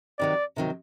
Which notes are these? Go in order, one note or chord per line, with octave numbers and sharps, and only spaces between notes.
C3 D#3 F#3 D5
C3 D#3 F#3